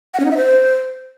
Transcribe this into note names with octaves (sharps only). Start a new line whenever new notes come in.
F#5
C#4
D#4
E5
C5